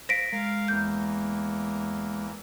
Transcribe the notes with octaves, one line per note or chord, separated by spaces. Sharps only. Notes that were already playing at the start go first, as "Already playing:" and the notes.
C5 F5 A#6 B6 D7
G#3 A#4 F5
E2 A#3 G6